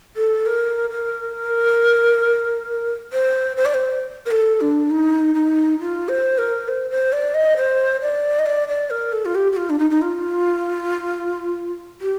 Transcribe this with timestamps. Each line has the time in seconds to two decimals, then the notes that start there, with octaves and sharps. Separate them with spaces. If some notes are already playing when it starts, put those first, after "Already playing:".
0.16 A4
0.46 A#4
0.90 A#4
3.13 C5
3.57 C5
3.65 D5
3.74 C5
4.26 A#4
4.31 A4
4.61 D4
4.90 D#4
5.35 D#4
5.79 F4
6.09 C5
6.38 A#4
6.68 C5
6.90 C5
7.13 D5
7.34 D#5
7.57 C5
8.01 D5
8.39 D#5
8.46 D5
8.68 D5
8.90 A#4
9.12 A4
9.25 F4
9.35 G4
9.52 G4
9.57 F4
9.70 D4
9.79 D#4
9.90 D#4
10.01 F4
12.01 G4